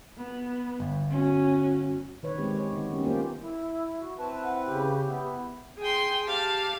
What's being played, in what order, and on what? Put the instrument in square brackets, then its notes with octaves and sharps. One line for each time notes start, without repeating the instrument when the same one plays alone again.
[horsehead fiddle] B3
[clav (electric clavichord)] G1
[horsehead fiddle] C#4 F#4
[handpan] D#3 B4 C#5
G#3 C4 G4
C#5
D#3 B3
G3 C#4 G4
A#3 F4 G4 C5
[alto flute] E4
[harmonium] F#4
[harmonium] C4 E4 B4 [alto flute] A5
[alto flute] F#5
[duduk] C#3 [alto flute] G4
[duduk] B3 [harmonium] E4
[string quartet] G#4 G5 C6
G4 F5 A5